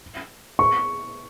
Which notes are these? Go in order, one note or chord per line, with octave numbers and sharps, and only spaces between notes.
C#6